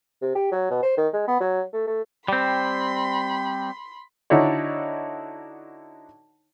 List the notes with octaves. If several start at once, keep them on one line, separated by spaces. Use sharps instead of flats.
C3
G4
F#3
B2
C5
D#3
G#3
B3
F#3
A3
A3
G3 C4 B5 C6
D3 D#4 E4 F#4 C#5 D5